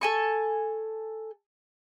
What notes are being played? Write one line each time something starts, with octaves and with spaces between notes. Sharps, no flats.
A4 G#5 C#6